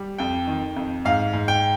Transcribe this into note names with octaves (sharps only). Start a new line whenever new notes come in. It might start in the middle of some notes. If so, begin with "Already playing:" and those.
Already playing: G3
F2 G5
D#3
F2
G#2 F5
G#2
G5